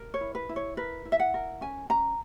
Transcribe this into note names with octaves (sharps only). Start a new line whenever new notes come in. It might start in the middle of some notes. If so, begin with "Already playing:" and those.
Already playing: A#4
C#5
E4
B4
E4
C#5
A#4 B4
E4
E5
F#5
A#4
C#4 G#5
C#4 A#5